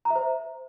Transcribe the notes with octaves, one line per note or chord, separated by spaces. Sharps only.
A#5
E5
C5